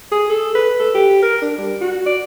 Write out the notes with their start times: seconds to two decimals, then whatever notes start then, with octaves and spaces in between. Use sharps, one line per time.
0.12 G#4
0.30 A4
0.55 B4
0.80 A4
0.95 G4
1.23 A#4
1.42 D4
1.58 G3
1.81 F#4
2.06 D5